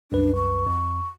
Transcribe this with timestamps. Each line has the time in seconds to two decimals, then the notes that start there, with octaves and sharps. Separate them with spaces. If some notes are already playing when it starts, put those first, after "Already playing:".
0.12 C2 F#2 D4 B4
0.36 C#6
0.67 F2